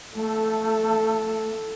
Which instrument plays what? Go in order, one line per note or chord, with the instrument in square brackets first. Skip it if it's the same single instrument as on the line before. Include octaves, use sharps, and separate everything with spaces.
[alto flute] A3 [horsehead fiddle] A4